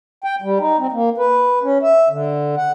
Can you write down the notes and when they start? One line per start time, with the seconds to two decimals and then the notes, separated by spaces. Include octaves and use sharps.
0.24 G5
0.42 G3
0.59 D#4
0.79 C4
0.92 A#3
1.18 B4
1.63 C#4
1.82 E5
2.10 D3
2.57 F#5